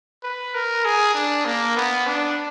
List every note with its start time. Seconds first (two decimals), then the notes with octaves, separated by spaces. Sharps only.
0.23 B4
0.54 A#4
0.85 G#4
1.14 D4
1.45 A#3
1.76 B3
2.07 D4